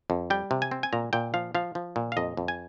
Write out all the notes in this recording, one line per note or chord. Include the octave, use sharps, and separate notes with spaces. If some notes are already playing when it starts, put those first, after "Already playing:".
F2
G3 G5
C3
G#5
C4
G#5
A#2 A#5
A#2 G5
F3 F5
F3 F5
F3
A#2
F5
F2 D#5
F2
G#5